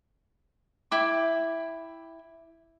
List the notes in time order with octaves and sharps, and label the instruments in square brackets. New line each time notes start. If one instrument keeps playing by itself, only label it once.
[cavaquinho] E4 G5 D6